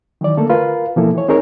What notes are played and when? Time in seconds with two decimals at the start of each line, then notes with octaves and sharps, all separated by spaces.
0.21 D#3 E3 F#3 D5
0.37 D3 A3 A#3 A4
0.50 F4 A#4 B4 F5
0.96 B2 E3 F3 A#3 E4 A4
1.14 E3 C#5
1.28 C4 D#4 G#4 A#4 C#5